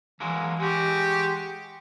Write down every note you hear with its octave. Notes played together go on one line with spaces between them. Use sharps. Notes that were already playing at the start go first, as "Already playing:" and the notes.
E3 F#3 G#3 A#3
G#3 F#4 G4